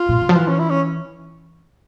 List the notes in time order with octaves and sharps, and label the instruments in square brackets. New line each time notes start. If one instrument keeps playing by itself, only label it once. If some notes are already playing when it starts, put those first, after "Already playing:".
Already playing: [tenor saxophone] F4
[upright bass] A#2
C3
F3
E3
[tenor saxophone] C#4
E4
C#4